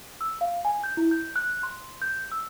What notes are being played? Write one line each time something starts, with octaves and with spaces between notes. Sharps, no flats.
E6
F5
G#5
G6
E4
G6
F#6
C6
G6
E6